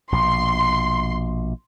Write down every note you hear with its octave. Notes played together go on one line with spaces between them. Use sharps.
A#1 B2 C6